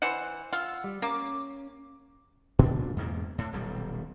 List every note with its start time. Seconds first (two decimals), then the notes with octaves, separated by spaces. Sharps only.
0.02 E3 C5 F#5
0.53 F4 F#5 E6
0.84 G3
1.02 A#3 C#4 D6
2.59 A#2 D4
2.96 E2 G#2 B2 A#3
3.38 A2
3.53 D#1 B1 G3